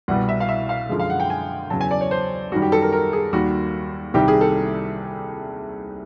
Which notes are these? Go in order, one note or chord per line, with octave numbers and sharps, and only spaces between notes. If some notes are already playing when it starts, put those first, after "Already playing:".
C2 B2 G3 F#5
E5
F5
E5
F5
F#2 D3 F3 G#3
F5
F#5
G5
G#5
E2 C#3 F#3 A5
G#5
D5
C#5
C5
F#2 D#3 G3 F#4
G4
A4
A#4
A#4
G#4
D#2 D#3 G3 F#4
C2 C3 D#3 G3 G4
G#4
A4